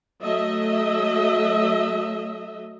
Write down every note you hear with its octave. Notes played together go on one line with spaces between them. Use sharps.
F#3 A3 D#5 E5